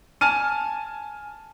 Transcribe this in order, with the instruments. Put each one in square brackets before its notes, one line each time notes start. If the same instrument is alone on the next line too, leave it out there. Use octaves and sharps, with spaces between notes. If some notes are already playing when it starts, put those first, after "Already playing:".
[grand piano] G#5 A5 F6 D#7